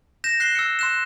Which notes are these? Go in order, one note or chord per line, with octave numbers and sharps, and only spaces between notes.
G6 A#6 E7
F#6 C7 E7 G7
E6 F6 C#7
C6 F#6 E7